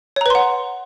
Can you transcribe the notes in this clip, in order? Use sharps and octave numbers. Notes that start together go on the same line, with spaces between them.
B4 C#5 F#5 A#5 C6